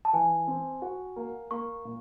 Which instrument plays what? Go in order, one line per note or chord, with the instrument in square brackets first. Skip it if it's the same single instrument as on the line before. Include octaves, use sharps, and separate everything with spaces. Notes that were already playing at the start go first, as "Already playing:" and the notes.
[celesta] A5
[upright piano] E3 [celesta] G#5
[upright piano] C4
F#4
A#3
[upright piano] A#3 [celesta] C#6
[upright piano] A#2